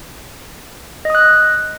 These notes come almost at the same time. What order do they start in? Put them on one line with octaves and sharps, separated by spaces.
D#5 D#6 F#6